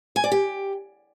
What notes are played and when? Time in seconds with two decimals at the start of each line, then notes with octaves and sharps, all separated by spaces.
0.16 G#5
0.24 D5
0.32 G4